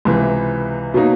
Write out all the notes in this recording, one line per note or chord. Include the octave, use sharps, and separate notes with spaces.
C#2 C3 E3
B2 F#3 A#3 D#4